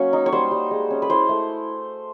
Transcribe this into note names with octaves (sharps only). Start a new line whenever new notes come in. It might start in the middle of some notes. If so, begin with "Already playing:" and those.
Already playing: F#3 A#3 C#4 C#5
D#4
C#5
G3 C5
G3
G#3
C#4
B4
E4 C5
A3